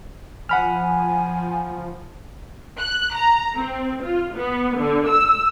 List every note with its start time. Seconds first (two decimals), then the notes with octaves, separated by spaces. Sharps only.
0.49 F3 F#5 G#5 B5 F6
2.79 F#6
3.15 A#5
3.57 C4
4.04 F4
4.36 B3
4.79 D3
5.08 E6